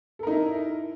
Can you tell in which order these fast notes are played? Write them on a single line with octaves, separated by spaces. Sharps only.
A4 A#4 D#4 E4